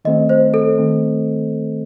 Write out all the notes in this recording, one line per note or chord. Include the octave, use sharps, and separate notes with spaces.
D#3 A3 C4 D#5
C5
A4
D#3 A3 C4